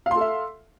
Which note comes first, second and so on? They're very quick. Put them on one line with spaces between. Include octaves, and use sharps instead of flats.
F5 C6 A4 E5